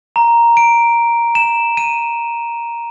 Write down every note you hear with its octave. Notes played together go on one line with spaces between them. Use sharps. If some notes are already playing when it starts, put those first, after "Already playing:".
A#5
D7
E7
D#7